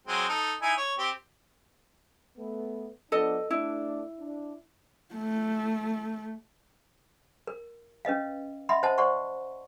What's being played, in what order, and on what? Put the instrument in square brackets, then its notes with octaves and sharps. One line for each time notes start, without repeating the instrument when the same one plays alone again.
[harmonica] F#3 G#3 C4
D#4 A4
D#4 E4 G#5
C#5
C4 G4
[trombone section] A3 B3
[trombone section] F3 B3 D4 [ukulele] A4 D#5
[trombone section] A3 D4 [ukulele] E4
[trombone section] D4
[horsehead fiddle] A3
[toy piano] A#4
C#4 B4 D#5 F5
D#5 E5 F#5 B5 C6
C5 D#5 F#5 A5
C5 D5 F#5 C6 C#6